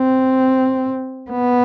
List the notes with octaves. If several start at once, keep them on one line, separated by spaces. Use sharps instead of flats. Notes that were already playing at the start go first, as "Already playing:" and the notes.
Already playing: C4
B3